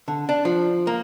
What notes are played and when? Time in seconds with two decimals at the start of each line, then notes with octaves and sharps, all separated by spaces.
0.08 D3
0.29 D4
0.45 F3
0.87 A#3